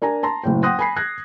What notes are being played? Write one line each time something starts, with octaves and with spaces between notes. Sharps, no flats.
D4 A#4 G#5 A#5
A5 A#5 C6
F#1 A2 G5
F#5 G5 C6 D#6 F#6 A#6
G#5 B5 C7
F#6 G#6 A#6